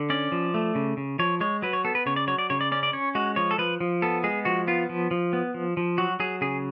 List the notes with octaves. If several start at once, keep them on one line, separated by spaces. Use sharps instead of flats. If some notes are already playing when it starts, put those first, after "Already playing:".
Already playing: D3
C#4 D5
F3
A3
C#3
C#3
F3 C#5
G#3 C#5
F#3 B4
C#5
B3 A4
B4
C#3 C#5
D5
F#3 C#5
D5
C#3 C#5
D5
C#4 D5
D5
C#4 C#5
G#3 F#4
F3 C#5
A4
F3 B4
F3
B3 A4
G#3 G#4
F3 F#4
B3 F4
F3
F3
B3
F3
F3
F#3 F#4
F#3 G#4
C#3 G#4